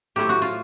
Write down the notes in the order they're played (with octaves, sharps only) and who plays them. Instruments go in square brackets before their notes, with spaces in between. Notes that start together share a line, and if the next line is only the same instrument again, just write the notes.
[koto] A2 F#3 A3 C4 E4 G4
F#4
F4